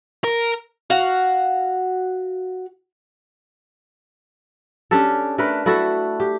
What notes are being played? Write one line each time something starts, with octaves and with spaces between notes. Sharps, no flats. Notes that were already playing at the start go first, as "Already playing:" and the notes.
A#4
F#4 F5 F#5
C#4 D4 G4 A4
A3 D4 A#4 B4
A3 E4 F#4 A4
G4